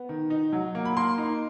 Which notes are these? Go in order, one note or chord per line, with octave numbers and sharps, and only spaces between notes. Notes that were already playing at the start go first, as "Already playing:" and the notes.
Already playing: B3
D#3
D#4
F#3
A#3
B5
A#3 C6
D#4